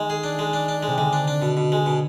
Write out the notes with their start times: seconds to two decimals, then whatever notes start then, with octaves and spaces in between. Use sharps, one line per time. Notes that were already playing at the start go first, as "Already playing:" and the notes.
Already playing: D#3 G#3
0.10 G#4
0.24 D4
0.39 G#3
0.53 D4
0.68 D4
0.83 C3 G#3
0.98 D3 G#3
1.13 D4
1.28 D4
1.42 B2
1.57 B2
1.72 G#3
1.86 B2